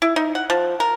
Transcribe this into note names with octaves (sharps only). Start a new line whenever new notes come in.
E4
D#4
F#5
F3
A#4